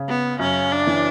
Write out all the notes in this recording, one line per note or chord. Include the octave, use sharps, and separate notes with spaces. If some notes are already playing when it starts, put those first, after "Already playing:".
Already playing: C#3
B3
F#2 C#4
D4
E3